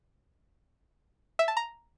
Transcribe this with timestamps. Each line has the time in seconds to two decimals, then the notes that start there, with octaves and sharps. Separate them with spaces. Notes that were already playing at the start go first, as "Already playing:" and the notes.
1.39 E5
1.48 A5
1.57 A#5